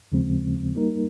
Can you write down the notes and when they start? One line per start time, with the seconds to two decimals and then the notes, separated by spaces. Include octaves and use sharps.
0.12 D#2 C#3 F3 G#3 C4
0.75 G3 A#3 D#4 A#4